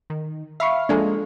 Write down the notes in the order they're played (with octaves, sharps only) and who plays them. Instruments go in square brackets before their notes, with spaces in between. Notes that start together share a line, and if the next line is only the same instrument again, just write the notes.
[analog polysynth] D#3
[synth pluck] E5 B5 C#6 [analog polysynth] F5
[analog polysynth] F3 G#3 A#3 [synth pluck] D4 A4